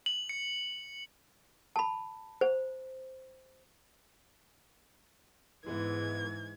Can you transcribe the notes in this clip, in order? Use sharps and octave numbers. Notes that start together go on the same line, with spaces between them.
F#7
C#7
A5 B5
C5
G#2 E3 G#3 B3 E4 G#6